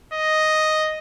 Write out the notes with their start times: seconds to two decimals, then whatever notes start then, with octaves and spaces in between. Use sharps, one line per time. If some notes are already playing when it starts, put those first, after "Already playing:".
0.14 D#5